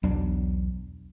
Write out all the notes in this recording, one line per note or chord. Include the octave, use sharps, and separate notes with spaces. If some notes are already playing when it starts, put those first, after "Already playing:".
B1 E2 F#3 D4